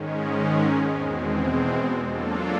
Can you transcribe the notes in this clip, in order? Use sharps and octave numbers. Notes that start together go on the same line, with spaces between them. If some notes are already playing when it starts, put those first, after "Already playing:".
Already playing: G#2 D#3 G#3 C#4
E2 B2 G#3 C4
F#3 A#3 D4 F4 A4